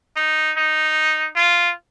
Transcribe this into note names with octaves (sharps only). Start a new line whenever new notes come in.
D#4
D#4
F4